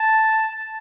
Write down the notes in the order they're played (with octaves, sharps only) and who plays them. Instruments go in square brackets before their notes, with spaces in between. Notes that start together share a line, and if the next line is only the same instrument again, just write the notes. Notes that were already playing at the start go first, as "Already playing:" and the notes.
Already playing: [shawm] A5